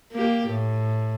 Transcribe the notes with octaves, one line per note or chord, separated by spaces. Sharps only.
A#3 G4
A2